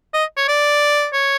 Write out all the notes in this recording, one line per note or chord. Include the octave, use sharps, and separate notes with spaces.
D#5
C#5
D5
C#5